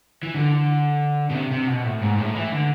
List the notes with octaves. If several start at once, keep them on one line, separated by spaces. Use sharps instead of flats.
E3
D3
B2
C3
C3
B2
A2
G#2
A2
E3
D3